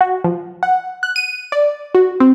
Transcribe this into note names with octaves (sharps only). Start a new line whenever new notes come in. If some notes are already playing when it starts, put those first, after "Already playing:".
F#4
F3
F#5
F#6
D#7
D5
F#4
C4